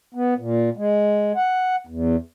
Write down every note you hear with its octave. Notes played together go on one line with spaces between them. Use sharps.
B3
A#2
G#3
F#5
E2